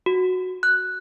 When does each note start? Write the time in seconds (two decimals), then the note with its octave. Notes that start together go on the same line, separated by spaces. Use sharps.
0.06 F#4
0.63 F#6